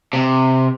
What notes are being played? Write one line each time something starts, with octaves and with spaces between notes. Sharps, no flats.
C3